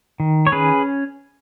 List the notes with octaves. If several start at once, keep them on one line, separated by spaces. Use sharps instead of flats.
D#3
C#5
C#4 G#4 B4